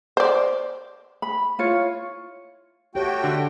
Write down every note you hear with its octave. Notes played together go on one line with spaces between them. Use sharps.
C5 D5
B5
E4 F4 C#5
A3 F#4 G4 C#5 G5
D3